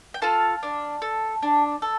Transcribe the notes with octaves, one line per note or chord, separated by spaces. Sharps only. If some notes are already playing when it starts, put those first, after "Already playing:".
G5
F4 A4 F5 A5
D4
A4
D4
A4